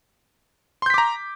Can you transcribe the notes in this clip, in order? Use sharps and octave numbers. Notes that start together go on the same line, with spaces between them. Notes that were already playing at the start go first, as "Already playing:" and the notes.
A#5 C6 D6 G6 B6